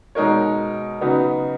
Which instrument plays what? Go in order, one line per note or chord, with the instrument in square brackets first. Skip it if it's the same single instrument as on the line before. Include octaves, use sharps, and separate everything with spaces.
[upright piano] B2 G#3 D#4 A#4 C#5
C#3 F#3 B3 D#4